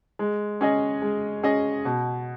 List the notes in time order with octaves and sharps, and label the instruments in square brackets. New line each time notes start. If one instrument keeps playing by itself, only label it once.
[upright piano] G#3
C#4 G#4 D#5
G#3
C#4 G#4 D#5
B2